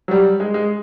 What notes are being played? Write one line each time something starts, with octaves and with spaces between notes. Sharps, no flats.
F#3
G3
G#3
G#3